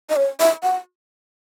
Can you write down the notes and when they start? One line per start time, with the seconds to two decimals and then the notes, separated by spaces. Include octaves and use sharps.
0.10 D#5
0.16 C#5
0.40 E5
0.63 F#5